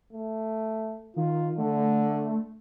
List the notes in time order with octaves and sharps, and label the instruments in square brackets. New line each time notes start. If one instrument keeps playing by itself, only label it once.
[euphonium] A3
[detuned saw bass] D#3 [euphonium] F4
[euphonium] D3 [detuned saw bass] A3